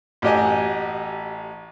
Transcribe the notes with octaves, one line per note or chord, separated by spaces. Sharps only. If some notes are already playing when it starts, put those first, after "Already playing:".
A1 F#4 G4 D#5 G#5